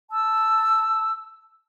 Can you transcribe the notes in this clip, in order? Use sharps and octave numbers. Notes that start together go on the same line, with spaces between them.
A5 E6